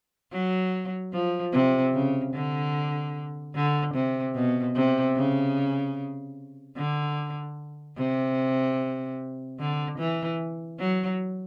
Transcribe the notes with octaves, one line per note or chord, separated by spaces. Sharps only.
F#3
F3
C3
C#3
D3
D3
C3
B2
C3
C#3
D3
C3
D3
E3
F#3